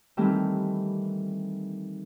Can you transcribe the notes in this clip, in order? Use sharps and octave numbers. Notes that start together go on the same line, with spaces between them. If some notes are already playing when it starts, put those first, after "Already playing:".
D#3 E3 G3 A3 C4